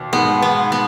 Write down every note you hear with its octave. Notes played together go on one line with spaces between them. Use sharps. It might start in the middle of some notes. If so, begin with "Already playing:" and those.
Already playing: D#2 B2 D#3
G#2 G#3 B3
B3
B3